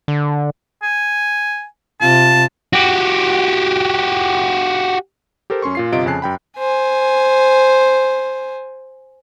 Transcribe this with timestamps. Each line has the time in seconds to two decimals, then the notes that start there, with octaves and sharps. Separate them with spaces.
0.08 D3
0.83 G#5
2.01 C3 F4 A5
2.73 F#4 G4
5.50 G4 A4 A#4 C5
5.62 F#2 C#4 C6 C#6
5.75 A#2 F4 C7
5.92 G1 C3 F4 D#5 D7
6.06 F2 C#3 G#5 A5 F#6 C7
6.22 F#2 G5 B5
6.58 C5 G#5